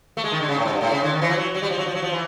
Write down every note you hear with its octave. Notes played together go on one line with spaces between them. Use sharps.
A3
G#3
D#3
D3
C#3
A2
G#2
G2
A2
C#3
D3
D#3
E3
F3
F#3
F#3
G3
F3
F#3
F3
F#3
F3
E3